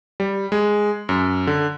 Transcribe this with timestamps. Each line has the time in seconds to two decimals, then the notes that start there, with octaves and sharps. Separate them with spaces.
0.20 G3
0.52 G#3
1.09 F#2
1.47 D3